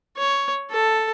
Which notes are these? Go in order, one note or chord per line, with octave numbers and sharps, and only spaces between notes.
C#5
A4